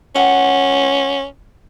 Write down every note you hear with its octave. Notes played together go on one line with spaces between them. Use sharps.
C#4 F#5